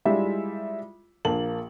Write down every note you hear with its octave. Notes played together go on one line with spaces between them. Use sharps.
G3 G#3 E4 F4 G4 E5
A#1 A#3 A5 F#7